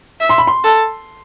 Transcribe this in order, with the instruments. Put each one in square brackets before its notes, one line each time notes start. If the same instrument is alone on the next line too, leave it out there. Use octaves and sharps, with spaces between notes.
[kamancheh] E5
[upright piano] C6
B5
C6
[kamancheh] A4